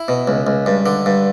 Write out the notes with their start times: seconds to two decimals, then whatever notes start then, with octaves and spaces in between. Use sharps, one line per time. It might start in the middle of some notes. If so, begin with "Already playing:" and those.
Already playing: E4
0.08 B2
0.28 C#2
0.47 C#2
0.66 G2
0.86 D3
1.06 G2